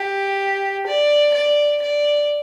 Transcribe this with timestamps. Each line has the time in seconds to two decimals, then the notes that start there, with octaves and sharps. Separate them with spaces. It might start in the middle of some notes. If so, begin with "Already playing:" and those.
Already playing: G4
0.87 D5
1.34 D5
1.83 D5